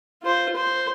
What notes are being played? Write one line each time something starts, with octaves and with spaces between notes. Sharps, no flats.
F4 C5
C5